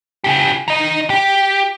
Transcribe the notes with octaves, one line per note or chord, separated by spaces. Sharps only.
C#3 G4
D#3 D#5
G4